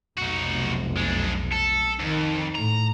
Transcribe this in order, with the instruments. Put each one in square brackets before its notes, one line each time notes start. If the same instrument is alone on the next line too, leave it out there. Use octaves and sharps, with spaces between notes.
[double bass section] F1 B1 [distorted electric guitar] D#4 F#4
[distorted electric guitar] G#3 D4
A4
[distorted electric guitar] F2 [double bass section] D#3
[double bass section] A2 [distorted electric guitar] A#5